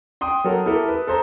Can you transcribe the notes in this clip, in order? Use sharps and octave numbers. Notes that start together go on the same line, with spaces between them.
G5 C6 D#6
F#3 A4 A#4
E4 G4 A4 A#4
B4
A4 C5 A#5